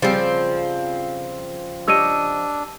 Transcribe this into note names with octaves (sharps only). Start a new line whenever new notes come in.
C#3 F3 G3 C4 G4
D4 G4 C#5 D#5 E6 D#7